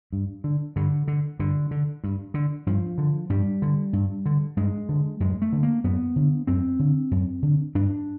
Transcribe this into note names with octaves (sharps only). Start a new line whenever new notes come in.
G2
D3
G2 D3
D3
G2 D3
D3
G2
D3
G2 F3
D3
G2 G3
D3
G2
D3
G2 G#3
D3
F#2 G#3
A3
D3
A#3
F#2 B3
D3
F#2 C4
D3
F#2
D3
G2 D4